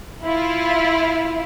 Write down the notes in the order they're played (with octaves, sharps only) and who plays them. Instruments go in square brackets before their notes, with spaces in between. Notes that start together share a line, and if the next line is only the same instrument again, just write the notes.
[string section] E4 F4